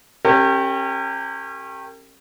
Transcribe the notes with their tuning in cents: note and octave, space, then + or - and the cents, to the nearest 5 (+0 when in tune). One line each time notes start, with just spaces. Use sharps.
C#4 -30 G4 +0 A#4 -40